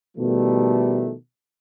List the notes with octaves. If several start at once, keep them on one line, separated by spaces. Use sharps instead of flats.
B2 D#3 F3 G3 A3